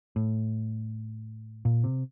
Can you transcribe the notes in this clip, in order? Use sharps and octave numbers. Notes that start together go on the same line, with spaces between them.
A2
A#2
C3